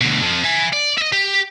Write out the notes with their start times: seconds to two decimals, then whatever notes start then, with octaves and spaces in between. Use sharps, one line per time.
0.01 D2 B2
0.22 F2 F3
0.44 E5 G#5
0.73 D5
0.98 D#5 E5
1.13 G4